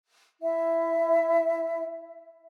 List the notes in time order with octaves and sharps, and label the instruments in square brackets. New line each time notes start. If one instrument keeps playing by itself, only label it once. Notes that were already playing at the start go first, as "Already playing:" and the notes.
[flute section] E4 E5